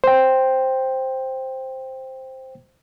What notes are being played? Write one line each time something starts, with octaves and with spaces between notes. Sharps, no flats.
C5 G5